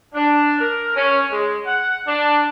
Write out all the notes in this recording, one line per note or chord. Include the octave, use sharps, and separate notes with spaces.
D4
A#4
C#4
G#3
F#5
D4